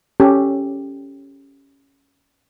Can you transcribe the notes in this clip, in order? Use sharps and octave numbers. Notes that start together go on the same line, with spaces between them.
C#4 G4 A4